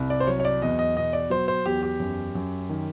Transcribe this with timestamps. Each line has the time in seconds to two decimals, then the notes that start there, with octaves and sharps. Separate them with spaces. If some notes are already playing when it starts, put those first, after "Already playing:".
Already playing: C2
0.10 D5
0.20 C5
0.27 F#3 C#5
0.40 C#5
0.45 D5
0.62 E2 D#5
0.79 D#5
0.96 B2 D#5
1.13 D5
1.30 F#3 C5
1.48 C5
1.65 E2 G4
1.83 G4
2.00 F#2
2.35 F#2
2.69 D#3